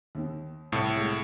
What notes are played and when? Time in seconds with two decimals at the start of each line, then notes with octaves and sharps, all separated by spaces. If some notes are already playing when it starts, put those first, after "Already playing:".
0.15 D#2 D#3
0.72 C2 A2 A4 C#5
0.95 C2 G#3